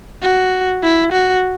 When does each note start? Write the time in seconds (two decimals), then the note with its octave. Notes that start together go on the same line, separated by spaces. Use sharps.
0.22 F#4
0.83 E4
1.12 F#4